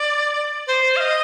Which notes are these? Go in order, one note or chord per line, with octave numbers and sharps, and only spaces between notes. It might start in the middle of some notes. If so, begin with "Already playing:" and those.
Already playing: D5
C5
F5
D#5